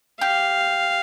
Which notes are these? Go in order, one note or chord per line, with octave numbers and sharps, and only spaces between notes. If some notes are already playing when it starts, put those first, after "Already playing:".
G4 F5